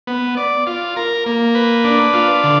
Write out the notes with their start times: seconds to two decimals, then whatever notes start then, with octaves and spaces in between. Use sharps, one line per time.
0.07 B3
0.37 D5
0.67 F4
0.96 A#4
1.26 A#3
1.55 B4
1.84 D4
2.14 F4
2.44 D3